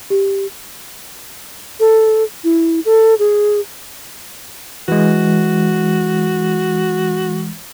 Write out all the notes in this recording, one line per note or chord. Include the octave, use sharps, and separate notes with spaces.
G4
A4
E4
A4
G#4
E3 G#3 F#4